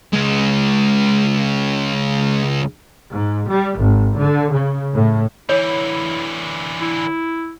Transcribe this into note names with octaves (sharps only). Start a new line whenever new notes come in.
C#2 G#3
G#2
G3
G#1
D3
C#3
A2
D3 E3 E4 C#5
E4